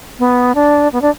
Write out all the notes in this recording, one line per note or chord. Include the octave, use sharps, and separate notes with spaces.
B3
D4
B3
D4